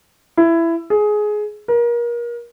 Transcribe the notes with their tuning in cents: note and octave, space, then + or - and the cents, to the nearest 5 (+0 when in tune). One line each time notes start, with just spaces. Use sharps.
E4 +15
G#4 +15
A#4 +30